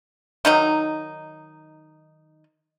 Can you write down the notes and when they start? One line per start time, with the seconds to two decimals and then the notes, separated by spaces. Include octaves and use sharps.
0.45 D#3 F#3 D#4